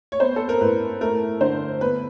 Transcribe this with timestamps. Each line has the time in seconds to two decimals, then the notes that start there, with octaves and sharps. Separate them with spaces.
0.12 C#5
0.20 B3 C5
0.36 A4
0.49 A#4
0.61 A2 B4
1.01 A3 A#4
1.41 D3 C5
1.81 B3 B4